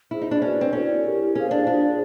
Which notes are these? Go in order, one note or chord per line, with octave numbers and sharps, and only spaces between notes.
E4 F4 G#4 C5
D#4
D4
C#4 D4 F#4 B4 D5
C4
C#4 E4 A4 D5
E4 G4 A#4
C#4 G#4 C5 F5
D4
D4 F4 G#4 C5